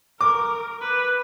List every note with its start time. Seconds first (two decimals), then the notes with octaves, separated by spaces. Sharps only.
0.20 A#4 D6
0.82 B4